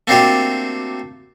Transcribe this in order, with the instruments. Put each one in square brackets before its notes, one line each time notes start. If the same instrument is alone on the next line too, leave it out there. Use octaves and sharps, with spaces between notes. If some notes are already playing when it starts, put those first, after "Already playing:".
[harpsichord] A3 A#3 C4 D4 F#4 G4